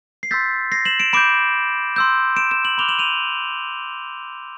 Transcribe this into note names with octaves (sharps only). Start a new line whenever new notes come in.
C7
C6 E6 G6 A6 B6
A#6 C7
E7 F#7
D7 E7
B5 D6 G6 D7 E7
C6 E6 G6
D7 E7
D7 E7
E7 F#7
B5 D6 F#6 F7 G7
E7 F#7
D#7 F7